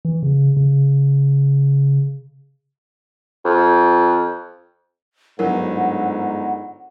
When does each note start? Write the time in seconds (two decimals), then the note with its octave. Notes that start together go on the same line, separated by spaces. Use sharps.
0.05 E3
0.23 C#3
0.57 C#3
3.45 F2
5.39 G1 G#2 F#3 A#4 F#5